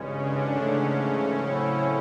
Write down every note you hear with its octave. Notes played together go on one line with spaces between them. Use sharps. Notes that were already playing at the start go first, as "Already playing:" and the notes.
Already playing: G#1 G2 C#3 E3 G#3 C#4
D3 D4
G#2 C#3 E3 A3 C#4
A2 F#3 A3 C4 E4